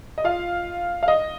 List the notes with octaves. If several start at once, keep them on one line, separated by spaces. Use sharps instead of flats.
D#5
F4 F5
F5
D#5